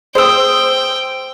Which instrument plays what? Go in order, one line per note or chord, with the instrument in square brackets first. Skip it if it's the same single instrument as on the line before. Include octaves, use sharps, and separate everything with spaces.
[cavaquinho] G#4 D#6 [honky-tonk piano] C5 E6 [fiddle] G5